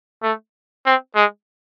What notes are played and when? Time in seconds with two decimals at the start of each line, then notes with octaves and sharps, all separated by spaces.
0.23 A3
0.86 C4
1.15 G#3